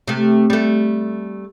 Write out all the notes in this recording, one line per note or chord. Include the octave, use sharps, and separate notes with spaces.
C3 A3
G3 A3